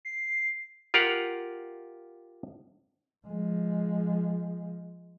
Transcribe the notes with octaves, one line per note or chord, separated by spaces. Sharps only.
C7
F4 G4 A#4 F5 F#5
F3 G#3